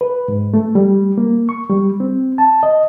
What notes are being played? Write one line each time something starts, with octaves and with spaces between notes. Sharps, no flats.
B4
G#2
A3
G3
A#3
C#6
G3
C4
A5
D#5